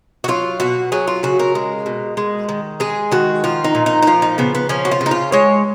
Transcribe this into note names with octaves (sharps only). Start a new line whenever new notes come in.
F#4
F#3 F4
B2 F#4
F#3 G#4
F4
C#3 F#4
A#4
G#3
B2
G#3
D#3
G#3 G#4
D#3 F#4
F3 F4
D#4
A#2
D#4
D#4
F3 F4
D#4
C#3 B3
B3
F3 C#4
F#4
F4
C#3
D#4
F4
G#3 C#5